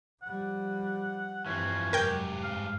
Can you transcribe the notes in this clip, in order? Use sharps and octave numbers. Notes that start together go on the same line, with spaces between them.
F3 G3 F#5
G2 E3 F3 C4 C#4
F1 G#2 F#3 G4 A#4 G5 G6
G2 F5